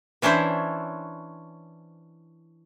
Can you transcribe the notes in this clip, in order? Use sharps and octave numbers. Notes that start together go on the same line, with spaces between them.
E3 C#4 D4 E4 C5 C#5